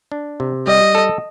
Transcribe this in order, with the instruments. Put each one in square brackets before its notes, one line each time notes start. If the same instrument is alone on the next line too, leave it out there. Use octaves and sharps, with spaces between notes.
[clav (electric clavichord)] D4
C3
[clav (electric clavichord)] G3 [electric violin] D#5
[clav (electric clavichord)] A4